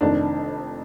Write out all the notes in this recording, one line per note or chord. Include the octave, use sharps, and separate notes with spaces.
F1 F2 D#3 D4